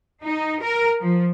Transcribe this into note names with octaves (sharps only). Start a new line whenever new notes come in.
D#4
A#4
F3